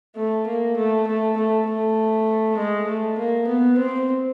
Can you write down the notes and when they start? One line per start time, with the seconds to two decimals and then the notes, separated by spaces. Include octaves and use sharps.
0.16 A3
0.47 A#3
0.77 A3
1.07 A3
1.37 A3
1.67 A3
2.57 G#3
2.87 A3
3.18 A#3
3.48 B3
3.78 C4